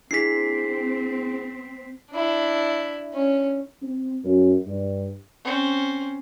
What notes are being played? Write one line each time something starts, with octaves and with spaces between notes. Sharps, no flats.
C4 D4 E4 G#4 B6 C7
D4 E4
C#4
C4
F#2
G2
C4 C#4